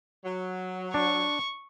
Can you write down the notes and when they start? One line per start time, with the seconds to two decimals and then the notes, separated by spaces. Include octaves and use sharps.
0.25 F#3
0.94 D4 C#6